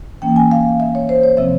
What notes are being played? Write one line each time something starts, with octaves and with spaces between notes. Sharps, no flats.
E3 A#3 C#4 G5
G#5
F5
E5
C#5
C5
C#5
C3 F3 C4 E5